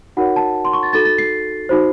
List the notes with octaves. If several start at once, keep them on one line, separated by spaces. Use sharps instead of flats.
D#4 F#4 A#4 C#5 F#5
A5
C6
C#6
A6
D#4 F#4 A4 A6
A6
C7
D#4 F#4 C5